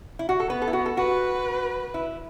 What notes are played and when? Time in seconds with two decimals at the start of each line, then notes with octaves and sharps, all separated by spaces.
0.19 E4
0.29 F#4
0.40 A4
0.49 B3 B4
0.62 A4
0.67 E4
0.73 F#4
0.86 A4
0.97 F#4 B4
1.94 E4